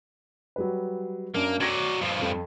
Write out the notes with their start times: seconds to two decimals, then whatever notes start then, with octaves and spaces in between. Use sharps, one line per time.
0.56 F#3 G3 B4
1.35 F#2 A#3 D4
1.61 F#3 D5 G#6 A#6 E7
2.01 G2 F3
2.22 F2